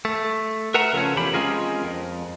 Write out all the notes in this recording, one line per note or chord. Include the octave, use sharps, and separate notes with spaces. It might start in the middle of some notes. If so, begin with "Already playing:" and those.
A3
A#4 B4 E5 F#5 A#5
C#3 F3 A3 C#4
E2 C3 E3 F3 G4 B5
G#3 C4 C#4 F4 G#4 A#4
F2